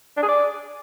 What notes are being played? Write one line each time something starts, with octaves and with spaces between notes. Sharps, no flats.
D4
G#4
D5